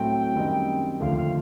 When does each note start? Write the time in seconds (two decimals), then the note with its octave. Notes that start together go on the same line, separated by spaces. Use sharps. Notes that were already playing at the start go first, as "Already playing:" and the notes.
Already playing: A2 F#3 A3 C4 G5
0.34 F#2 D#3 G3 C4 D#4
1.00 D#2 D3 F3 A3 F5
1.16 F5